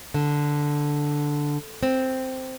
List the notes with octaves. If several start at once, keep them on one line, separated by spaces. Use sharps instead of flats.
D3
C4